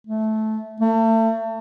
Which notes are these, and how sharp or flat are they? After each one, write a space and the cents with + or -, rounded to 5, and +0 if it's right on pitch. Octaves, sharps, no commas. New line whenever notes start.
A3 -15
A3 +35